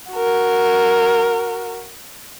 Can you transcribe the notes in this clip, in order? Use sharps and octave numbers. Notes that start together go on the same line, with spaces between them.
F#4 A#4